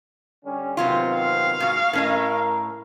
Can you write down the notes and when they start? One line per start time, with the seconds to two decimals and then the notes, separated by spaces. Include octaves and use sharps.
0.44 D3 G3 C#4
0.77 C3 D#3 F#3 B3 C4 F4
1.15 F5
1.60 G#2 F#4
1.93 A2 C#4 A#4 D#5